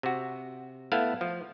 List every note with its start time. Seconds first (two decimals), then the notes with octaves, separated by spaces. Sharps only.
0.03 C3 F#4
0.92 A3 B3 E4 F5
1.21 F3